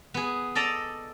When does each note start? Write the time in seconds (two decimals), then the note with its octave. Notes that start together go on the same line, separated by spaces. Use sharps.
0.14 B3 G#4
0.55 A4 D5 D#5 A5 A#5